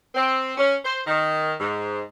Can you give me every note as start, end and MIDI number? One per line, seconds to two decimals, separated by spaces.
0.15 0.52 60
0.57 0.75 61
0.84 0.99 72
1.05 1.53 51
1.59 2.00 44